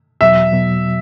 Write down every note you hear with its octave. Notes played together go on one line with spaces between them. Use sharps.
E2 B2 F#3 E5
B2 F#3